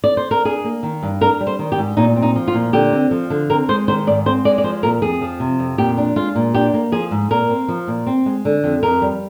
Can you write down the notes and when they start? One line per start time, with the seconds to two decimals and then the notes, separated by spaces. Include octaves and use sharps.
0.04 D5
0.17 C5
0.31 A#4
0.45 D4 G#4
0.64 A#3
0.83 D#3
1.03 G2
1.21 D4 A#4
1.41 G3
1.47 C5
1.59 D#3
1.72 G4
1.78 G#2
1.97 A#2 D#4
2.16 C4
2.22 D#4
2.36 F3
2.48 F4
2.54 A#2
2.73 D3 G4
2.93 C4
3.11 F3
3.30 D3
3.50 C4 A#4
3.69 G#3 C5
3.88 D#3 C5
4.07 G#2 D5
4.26 C4 C5
4.45 G#3 D5
4.58 D5
4.64 F3 C5
4.83 A#2 A#4
5.02 F2 G#4
5.21 F3
5.40 C3
5.59 F2
5.78 A#2 G4
5.97 D4
6.16 G#3 F4
6.35 A#2
6.54 D4 G4
6.74 A#3
6.92 F3 G#4
7.11 G#2
7.31 A#2 A#4
7.49 C4
7.68 F3
7.87 A#2
8.07 C4
8.26 G#3
8.45 D3
8.64 F2
8.83 F2 A#4
9.02 G3